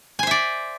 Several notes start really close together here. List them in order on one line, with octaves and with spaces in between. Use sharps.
G#5 C5 E5 D5